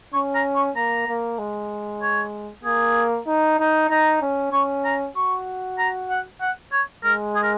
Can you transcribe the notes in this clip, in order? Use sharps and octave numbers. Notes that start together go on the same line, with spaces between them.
C#4 C#6
A#5
C#6
A#3 A#5
A#3
G#3
C#5
A#3 G#4
D#4
D#4
D#4 A#5
C#4
C#4 C#6
A#5
F#4 C#6
A#5
F#5
F#5
C#5
G#3 A#4
G#4
A#4